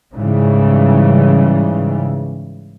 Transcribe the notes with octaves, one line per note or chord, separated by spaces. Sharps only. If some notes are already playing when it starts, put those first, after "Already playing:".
G#2 C#3 E3 G3